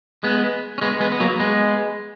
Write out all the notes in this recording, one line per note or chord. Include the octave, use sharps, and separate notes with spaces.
G#3 B3
C#4
G#3 B3
G#3 B3
B3
F#3 A#3
G#3 B3